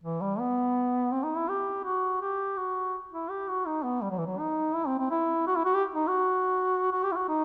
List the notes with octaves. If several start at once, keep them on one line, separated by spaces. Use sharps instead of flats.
E3
G3
B3
C4
D#4
E4
G4
F#4
G4
F#4
E4
G4
F#4
D#4
B3
G3
F#3
E3
F#3
D#4
E4
C4
C4
E4
F#4
E4
F#4
G4
D#4
F#4
F#4
G4
E4
F#4
D#4